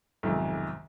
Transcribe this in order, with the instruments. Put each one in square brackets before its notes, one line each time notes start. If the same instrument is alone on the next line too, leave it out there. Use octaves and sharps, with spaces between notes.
[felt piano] B1 F2 G#2 C3 D#3